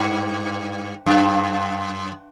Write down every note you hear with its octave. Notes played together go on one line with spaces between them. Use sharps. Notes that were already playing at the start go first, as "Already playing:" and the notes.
Already playing: G2
F#2